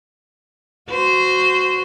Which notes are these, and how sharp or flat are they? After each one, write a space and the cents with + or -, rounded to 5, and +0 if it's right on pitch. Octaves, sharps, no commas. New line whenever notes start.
F#4 +0 C5 -15